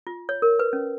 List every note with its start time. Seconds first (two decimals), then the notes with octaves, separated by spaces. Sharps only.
0.07 F4
0.29 C#5
0.42 A#4
0.59 B4
0.73 C#4